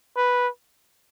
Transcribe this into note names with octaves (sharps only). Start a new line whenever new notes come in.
B4